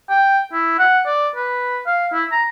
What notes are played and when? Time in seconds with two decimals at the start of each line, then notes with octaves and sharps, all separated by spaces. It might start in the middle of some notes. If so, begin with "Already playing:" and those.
0.10 G5
0.53 E4
0.79 F#5
1.07 D5
1.36 B4
1.86 F5
2.13 E4
2.32 A#5